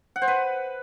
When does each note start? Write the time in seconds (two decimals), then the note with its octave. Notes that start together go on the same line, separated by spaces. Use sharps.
0.16 F#5
0.22 C5
0.28 B4